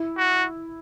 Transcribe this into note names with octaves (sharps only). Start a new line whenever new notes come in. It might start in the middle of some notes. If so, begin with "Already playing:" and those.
Already playing: E4
F#4